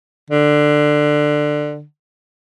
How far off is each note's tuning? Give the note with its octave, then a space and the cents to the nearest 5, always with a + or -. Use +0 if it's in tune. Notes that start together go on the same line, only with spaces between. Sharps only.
D3 +15